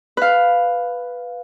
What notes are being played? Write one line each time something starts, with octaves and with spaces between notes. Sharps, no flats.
B4 F5